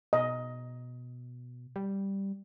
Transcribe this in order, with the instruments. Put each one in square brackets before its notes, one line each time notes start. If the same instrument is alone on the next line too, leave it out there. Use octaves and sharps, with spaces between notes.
[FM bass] B2 [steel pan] D#5
[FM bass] G3